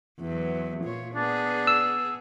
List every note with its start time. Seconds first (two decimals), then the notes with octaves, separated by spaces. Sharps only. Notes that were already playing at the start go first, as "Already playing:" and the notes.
0.20 E2 F#3
0.84 A#2 F4 C#5
1.15 B3 D4 G#4
1.67 E6